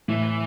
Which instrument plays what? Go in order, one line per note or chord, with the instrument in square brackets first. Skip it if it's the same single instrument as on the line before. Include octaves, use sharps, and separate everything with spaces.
[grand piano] A2 [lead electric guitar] E3